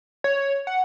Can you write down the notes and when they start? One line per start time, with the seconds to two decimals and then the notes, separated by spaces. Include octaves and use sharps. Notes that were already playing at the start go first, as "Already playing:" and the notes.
0.24 C#5
0.67 F#5